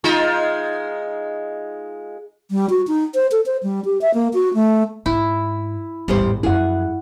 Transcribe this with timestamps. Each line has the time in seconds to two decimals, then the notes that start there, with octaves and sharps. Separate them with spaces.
0.04 G#3 D#4 F4
2.51 G3
2.70 F#4
2.88 D#4
3.15 C5
3.32 A4
3.46 C5
3.63 G3
3.85 G4
4.01 E5
4.14 A#3
4.34 F#4
4.54 A3
5.06 G#2 E4
6.08 A1 E2 G#2 G3 C5
6.43 F#2 F3 E4 G#4 F#5